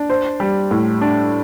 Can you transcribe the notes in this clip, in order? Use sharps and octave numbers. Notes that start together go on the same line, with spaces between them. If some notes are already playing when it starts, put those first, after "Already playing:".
Already playing: D4
C5
G3
A2
D4